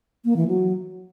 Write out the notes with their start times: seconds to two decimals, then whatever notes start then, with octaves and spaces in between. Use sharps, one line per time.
0.25 A#3
0.36 E3
0.48 F#3